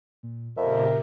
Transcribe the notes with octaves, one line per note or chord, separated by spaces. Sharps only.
A#2
F2 A#2 C#3 G4 A#4 E5